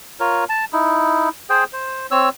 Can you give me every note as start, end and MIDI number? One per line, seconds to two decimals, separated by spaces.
0.20 0.45 65
0.20 0.45 70
0.20 0.45 73
0.49 0.65 81
0.73 1.29 63
0.73 1.29 64
1.49 1.64 68
1.49 1.64 72
1.49 1.64 79
1.73 2.07 72
2.11 2.29 60
2.11 2.29 73
2.11 2.29 88